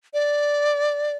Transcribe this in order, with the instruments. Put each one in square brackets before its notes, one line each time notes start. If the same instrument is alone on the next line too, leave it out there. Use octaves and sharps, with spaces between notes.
[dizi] D5